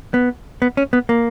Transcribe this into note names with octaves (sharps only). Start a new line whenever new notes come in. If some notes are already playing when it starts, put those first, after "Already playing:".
B3
B3
C#4
B3
A#3